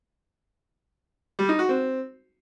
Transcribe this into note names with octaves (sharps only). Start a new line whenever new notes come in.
G3
D#4
F#4
C4